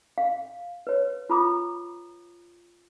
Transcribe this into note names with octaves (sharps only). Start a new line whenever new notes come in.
F5
B4 C#5
F4 A#5 B5 D6 D#6